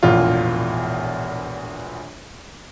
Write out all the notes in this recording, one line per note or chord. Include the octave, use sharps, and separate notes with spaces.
E1 A#1 E2 A2 F4